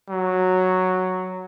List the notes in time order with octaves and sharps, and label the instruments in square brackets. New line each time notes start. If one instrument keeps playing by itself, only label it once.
[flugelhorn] F#3